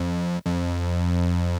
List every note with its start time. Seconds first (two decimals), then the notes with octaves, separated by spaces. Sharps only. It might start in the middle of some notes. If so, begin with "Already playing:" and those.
Already playing: F2
0.45 F2